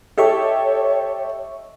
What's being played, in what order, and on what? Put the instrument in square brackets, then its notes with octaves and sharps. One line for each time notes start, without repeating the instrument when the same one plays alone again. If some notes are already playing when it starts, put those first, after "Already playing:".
[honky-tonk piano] G4 A4 [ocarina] C#5 [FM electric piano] D#5 E5 C#6